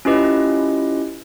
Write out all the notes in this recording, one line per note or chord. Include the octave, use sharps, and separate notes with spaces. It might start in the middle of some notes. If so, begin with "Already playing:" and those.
C#4 E4 F4 G4 B4 D#5